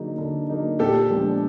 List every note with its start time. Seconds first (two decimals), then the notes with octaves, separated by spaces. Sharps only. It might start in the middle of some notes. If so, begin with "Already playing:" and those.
Already playing: D3 F#3 A#3 D#4 G#4
0.18 D3
0.49 F#3 A#3 D#4 G#4
0.79 A#2 G4 A4
1.10 F3 G#3 B3 D4